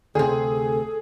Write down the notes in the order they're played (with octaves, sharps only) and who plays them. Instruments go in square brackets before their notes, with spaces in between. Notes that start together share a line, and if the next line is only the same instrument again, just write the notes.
[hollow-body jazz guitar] D2 C3 [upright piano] G#4 [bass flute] A4